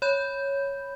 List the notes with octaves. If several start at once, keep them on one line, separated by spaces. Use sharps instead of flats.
C#5 B5 G6